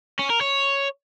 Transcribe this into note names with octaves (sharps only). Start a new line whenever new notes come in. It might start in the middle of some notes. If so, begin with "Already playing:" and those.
C#4
A#4
C#5